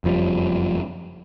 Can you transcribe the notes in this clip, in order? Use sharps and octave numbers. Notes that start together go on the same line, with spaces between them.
F#1 F2 F3 G3